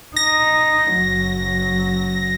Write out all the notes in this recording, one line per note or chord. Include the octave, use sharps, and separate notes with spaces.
D#4 A#6
F#1 F#3